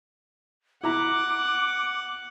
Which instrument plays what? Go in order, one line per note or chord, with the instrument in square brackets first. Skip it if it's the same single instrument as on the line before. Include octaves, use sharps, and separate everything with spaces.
[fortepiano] E4 A#5 [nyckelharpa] F#5 [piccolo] D6